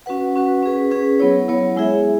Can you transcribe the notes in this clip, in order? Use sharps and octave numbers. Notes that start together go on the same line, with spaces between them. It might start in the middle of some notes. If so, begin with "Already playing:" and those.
C#4 F#4 B4 F#5
C#4 F#4 B4 F#5
C#4 G#4 B4
C#4 G#4 B4
F#3 B3 E4 C#5
F#3 B3 E4 C#5
G#3 E4 G#4 E5
E5